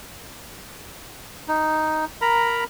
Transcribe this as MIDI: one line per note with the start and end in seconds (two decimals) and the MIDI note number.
1.48 2.05 63
2.21 2.64 70
2.21 2.64 82
2.21 2.64 83